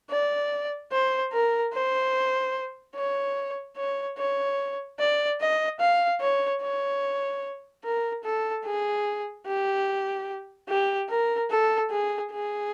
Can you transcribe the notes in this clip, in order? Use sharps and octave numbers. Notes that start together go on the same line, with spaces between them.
D5
C5
A#4
C5
C#5
C#5
C#5
D5
D#5
F5
C#5
C#5
A#4
A4
G#4
G4
G4
A#4
A4
G#4
G#4